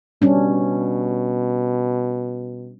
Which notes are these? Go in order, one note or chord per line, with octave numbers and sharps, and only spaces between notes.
B2 G3 C#4 D4